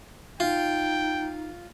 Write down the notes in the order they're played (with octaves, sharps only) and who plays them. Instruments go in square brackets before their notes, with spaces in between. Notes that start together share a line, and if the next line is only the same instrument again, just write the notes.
[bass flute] D#4 [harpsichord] F4 [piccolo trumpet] G5